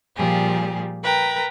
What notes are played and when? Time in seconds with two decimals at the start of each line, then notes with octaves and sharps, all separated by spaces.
0.17 A#2 F3 G3 G4 G#4
1.03 A#4 B4 G5 A#5